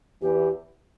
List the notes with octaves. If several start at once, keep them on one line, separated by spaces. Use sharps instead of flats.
E2 E3 G4